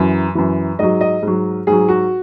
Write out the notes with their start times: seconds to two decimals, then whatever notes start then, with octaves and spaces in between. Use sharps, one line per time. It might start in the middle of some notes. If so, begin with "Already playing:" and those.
Already playing: F#2 E3
0.35 F#2 E3
0.79 G#2 F#3 D#5
1.01 D#5
1.22 G#2 F#3
1.67 G#2 F#3 G#4
1.89 F#4